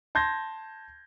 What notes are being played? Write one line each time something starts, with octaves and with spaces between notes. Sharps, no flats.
A5 C6 G6 G#6 A#6